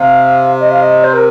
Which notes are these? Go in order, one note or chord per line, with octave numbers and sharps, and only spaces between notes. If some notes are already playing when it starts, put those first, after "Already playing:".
Already playing: C3 F5
D#5
F5
D#5
C5
A#4